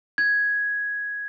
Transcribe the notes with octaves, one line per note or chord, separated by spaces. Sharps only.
G#6